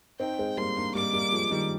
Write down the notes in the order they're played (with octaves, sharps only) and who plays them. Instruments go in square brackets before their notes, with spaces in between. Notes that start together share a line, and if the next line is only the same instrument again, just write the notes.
[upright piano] C4 D#4 [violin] G5
[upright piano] G#3 C4
[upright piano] G3 A#3 [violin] C6
[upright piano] A#3 D4
[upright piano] G3 A#3 [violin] D6
[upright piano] G3 A#3
F3 G#3
D#3 G3